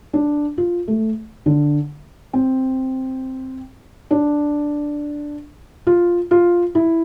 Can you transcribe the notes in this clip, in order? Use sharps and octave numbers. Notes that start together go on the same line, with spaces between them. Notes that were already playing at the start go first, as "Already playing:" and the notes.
D4
F4
A3
D3
C4
D4
F4
F4
E4